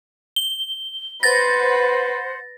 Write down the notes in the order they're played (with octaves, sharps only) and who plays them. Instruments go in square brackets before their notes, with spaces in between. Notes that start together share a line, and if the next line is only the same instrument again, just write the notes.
[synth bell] G7
[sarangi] B4 [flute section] C5 F#5 [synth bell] A6 A#6